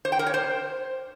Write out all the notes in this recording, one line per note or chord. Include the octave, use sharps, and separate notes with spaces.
C5
G5
A#4
C#5
C5